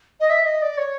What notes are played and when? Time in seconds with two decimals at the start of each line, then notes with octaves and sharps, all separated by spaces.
0.20 D#5
0.30 E5
0.45 D#5
0.62 D5
0.78 C#5